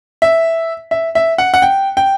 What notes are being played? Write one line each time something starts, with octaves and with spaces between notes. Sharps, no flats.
E5
E5
E5
F#5
F#5
G5
G5